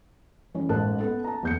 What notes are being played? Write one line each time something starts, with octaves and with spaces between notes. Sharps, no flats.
E3 C#4 C#5
A1 G#2 A#4 A5 F#6
B3 A4
A5 A#5
E2 G6 C#7